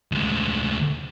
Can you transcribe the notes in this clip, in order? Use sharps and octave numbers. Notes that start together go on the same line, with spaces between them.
D2 G#3